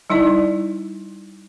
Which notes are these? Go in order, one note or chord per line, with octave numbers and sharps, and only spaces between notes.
G3 D#4 E4 D5